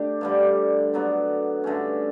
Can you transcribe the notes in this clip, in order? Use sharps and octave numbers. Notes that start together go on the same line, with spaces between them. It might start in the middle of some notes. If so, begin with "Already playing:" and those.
Already playing: A3 D4 G4
G2 D3 G3
D3 F#3 B3
G2 D3 A3 C#4